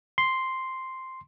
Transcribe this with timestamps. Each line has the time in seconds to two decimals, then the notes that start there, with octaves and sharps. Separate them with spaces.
0.18 C6